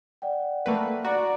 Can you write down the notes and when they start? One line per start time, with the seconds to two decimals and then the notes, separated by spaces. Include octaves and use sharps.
0.22 D5 F#5 G5
0.66 A3 A#3 B4
1.05 F#4 D5 A#5